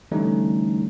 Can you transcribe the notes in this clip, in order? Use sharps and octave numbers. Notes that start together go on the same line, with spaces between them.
D3 E3 G3 A3 C#4 D#4